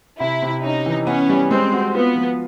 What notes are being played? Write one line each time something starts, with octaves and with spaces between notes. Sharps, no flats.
C3 E4
C3
C#4 D#4
E3
B3 C#4
G3
G#3 C4
F#4
B3 F4
F3